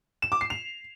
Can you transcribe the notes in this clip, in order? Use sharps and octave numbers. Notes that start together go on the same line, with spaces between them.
E7
D6
C7
F7